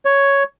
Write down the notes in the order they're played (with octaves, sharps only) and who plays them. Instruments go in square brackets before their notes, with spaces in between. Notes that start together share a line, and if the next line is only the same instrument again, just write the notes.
[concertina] C#5